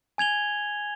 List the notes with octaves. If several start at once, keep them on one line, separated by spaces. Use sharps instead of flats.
G#5 G#6 F7 G7